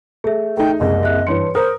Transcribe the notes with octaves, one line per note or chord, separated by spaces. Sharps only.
A3 G#4 E5
A3 D#4 G5
F#1 C2 G#3 D#5
E5 F#6
G2 E3 B4 C#5 C6 C#7
A#4 C5 D#6